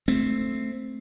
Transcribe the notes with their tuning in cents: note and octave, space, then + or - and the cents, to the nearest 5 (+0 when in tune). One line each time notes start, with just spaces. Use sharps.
A3 +0 C4 +0